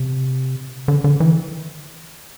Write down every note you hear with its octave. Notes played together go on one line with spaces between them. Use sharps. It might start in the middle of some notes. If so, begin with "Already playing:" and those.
Already playing: C3
D3
D3
E3